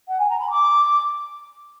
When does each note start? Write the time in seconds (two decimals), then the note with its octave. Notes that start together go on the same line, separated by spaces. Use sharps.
0.08 F#5
0.19 G#5
0.29 A#5
0.39 B5
0.50 D6